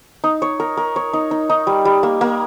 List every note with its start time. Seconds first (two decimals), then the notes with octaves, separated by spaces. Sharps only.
0.24 D#4
0.42 C#5
0.60 A#4
0.77 A#4
0.96 C#5
1.13 D#4
1.31 D#4
1.50 D#4
1.67 G3
1.85 G3
2.03 A#3
2.21 A#3